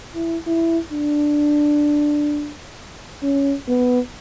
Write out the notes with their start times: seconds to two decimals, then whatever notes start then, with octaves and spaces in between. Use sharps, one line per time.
0.15 E4
0.46 E4
0.92 D4
3.22 C#4
3.68 B3